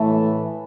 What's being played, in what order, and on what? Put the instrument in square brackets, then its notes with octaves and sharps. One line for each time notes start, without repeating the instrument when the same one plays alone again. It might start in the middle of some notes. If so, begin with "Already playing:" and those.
Already playing: [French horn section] A2 E3 A3